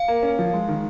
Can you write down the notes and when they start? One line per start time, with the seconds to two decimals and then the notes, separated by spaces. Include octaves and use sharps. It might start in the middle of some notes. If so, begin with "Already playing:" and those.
Already playing: F5
0.08 A#3
0.23 C#4
0.39 F3
0.53 G#3
0.69 D#3